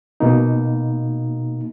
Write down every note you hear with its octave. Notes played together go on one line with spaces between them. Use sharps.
B2 A#3 D#4